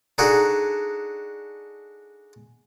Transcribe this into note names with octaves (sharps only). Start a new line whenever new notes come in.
D4 D#4 F#4 G#4 A4